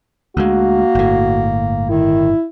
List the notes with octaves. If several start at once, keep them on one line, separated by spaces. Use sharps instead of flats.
D2 G#3 A#3 F#4
G1 A2
D#3 E4